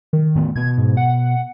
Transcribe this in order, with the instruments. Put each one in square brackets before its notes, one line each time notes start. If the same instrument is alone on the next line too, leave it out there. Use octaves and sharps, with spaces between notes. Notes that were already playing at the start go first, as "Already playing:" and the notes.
[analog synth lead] D#3
[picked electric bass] A2 A3 B3
[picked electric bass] B2 B3 [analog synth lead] G#6
[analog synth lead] G#2
F#5